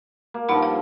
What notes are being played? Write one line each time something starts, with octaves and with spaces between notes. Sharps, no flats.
A#3
G2 F3 D#4 F#5 B5
F5